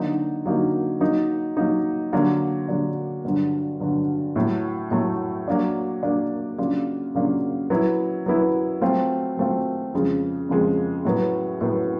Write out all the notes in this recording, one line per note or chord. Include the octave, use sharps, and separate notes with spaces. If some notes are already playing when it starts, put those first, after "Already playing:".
Already playing: D3 F#3 A#3 D#4 F#4
D3 F#3 A#3 D#4 F#4
F#3 A#3 D#4
F#3 A#3 D#4
D3 F#3 A#3 D4
D3 F#3 A#3 D4
G2 D3 F#3
G2 D3 F#3
A2 F#3 A3
A2 F#3 A3
F#3 A#3 D4
F#3 A#3 D4
C#3 F#3 A#3 D4 F4
C#3 F#3 A#3 D4 F4
F#3 B3 E4
F#3 B3 E4
F#3 A3 C4 F4
F#3 A3 C4 F4
F2 C#3 F3 G#3
F2 C#3 F3 G#3
A2 F#3 B3
A2 F#3 B3